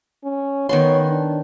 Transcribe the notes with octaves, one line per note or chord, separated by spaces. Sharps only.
C#4
D#3 B3 C#5 C6
D4